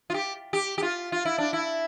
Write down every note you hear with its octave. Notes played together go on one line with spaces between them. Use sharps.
F4
G4
G4
G4
F4
F4
E4
D4
E4